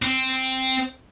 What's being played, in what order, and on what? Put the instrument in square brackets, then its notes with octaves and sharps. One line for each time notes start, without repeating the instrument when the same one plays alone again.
[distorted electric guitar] C4